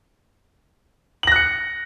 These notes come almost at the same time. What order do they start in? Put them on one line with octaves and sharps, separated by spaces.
F#7 A#6 F#6 C#7